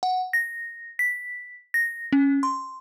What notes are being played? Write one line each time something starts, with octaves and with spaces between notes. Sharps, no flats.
F#5
A#6
B6
A#6
C#4
C6